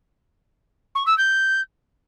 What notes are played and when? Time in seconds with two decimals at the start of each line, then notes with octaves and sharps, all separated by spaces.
0.95 C#6
1.07 E6
1.18 G6